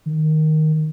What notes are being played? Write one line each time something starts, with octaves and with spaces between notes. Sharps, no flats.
D#3